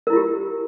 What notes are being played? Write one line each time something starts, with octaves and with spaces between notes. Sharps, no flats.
E4 F4 G4 A#4